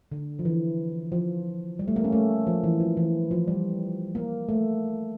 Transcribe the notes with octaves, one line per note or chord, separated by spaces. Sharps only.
D3
F3
E3
F3
G3
A3
A#3
C#4
A3
F3
E3
F3
E3
F3
G3
A#3
A3